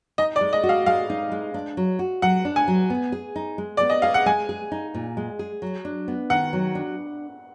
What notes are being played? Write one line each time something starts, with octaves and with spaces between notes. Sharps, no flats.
D#4 D#5
D5
G#3
D#5
F#4
F5
G#3 F5
D#4
G#3
D4
F#3
F#4
F#3 F#5
D4
G#5
F#3
B3
G#4
D#4
G#3
B3 D5
D#5
G#4 F5
F#5
G#3 G#5
G#4
D#4
A#2
G#3
G#4
F#3
D4
B3
D#3 F#5
F#3
D4